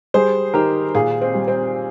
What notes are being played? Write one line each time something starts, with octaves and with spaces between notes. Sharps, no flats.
G3 G#4 C5
D#3 G4 A#4
A#2 F4 G#4
C4
G3
C4